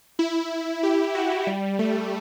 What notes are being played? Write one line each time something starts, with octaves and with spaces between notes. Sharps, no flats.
E4
G4
F#4
G3
A3